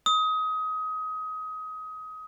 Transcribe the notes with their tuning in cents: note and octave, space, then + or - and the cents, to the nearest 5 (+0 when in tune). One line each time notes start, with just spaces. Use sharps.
D#6 +25